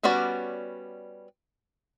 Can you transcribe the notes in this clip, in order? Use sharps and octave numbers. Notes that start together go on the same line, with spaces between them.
G3 B3 C#4 F#4 D5